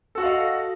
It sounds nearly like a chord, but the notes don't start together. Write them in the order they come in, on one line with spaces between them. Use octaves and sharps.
A4 F#4 F#5 F5 D#5